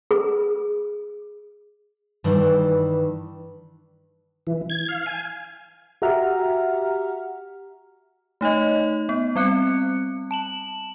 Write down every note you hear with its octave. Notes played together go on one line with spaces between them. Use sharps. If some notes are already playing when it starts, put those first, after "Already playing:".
G#4
G2 D#3 E3
E3
G#6
F5
G#5
F#4 G4 E5 F#5 A#5 F6
A3 D#4 C#5 D#5
B3
G3 C4 F#6 C#7
A5 E7 F#7